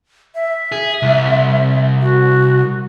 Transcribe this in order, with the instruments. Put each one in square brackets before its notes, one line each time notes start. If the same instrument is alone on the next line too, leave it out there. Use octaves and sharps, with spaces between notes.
[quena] E5
[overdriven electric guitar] G#4
C2
[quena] F#4